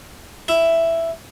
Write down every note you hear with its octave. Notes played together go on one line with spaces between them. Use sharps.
E4 E5